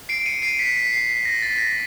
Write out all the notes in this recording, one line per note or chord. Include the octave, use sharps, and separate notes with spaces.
C7 D7
C#7 D#7
C7 D7
B6 C#7
B6 C#7
C7
B6
A#6
A6
B6
A#6